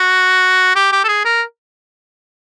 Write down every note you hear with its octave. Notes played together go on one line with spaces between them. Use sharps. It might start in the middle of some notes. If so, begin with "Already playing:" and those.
Already playing: F#4
G4
G4
A4
G#4
A#4